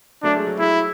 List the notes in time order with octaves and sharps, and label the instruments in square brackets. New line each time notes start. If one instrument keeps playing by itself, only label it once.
[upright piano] F#3 A3 [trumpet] D4
[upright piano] G#3
F#3
[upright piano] G#3 [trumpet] E4